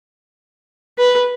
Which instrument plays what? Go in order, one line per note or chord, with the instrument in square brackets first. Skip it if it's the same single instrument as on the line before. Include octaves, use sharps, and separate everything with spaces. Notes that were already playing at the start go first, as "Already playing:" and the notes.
[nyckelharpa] B4